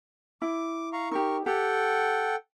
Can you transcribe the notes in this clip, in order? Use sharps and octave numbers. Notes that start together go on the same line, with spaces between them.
E4 D6
F5 A#5 C#6
D#4 G4 A#4 C#6
G4 A4 F#5 G5